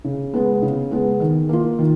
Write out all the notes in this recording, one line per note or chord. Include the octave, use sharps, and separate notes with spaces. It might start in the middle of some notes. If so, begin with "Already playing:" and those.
C#3
G#3 B3
C#3
G#3 B3
D#3
A#3 F4
D#3